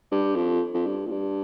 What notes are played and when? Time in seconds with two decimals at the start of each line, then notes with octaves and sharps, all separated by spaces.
0.11 G2
0.36 F2
0.74 F2
0.86 G2
1.06 A#2
1.11 G2